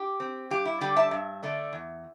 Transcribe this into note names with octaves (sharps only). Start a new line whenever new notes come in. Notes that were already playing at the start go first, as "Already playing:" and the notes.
Already playing: G4
C4
G2 G4
E4
D3 G3 D4 G4
E5 A5
G2
D3 A3 D4
E2